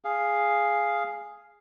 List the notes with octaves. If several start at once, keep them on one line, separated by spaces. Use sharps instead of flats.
G#4 F5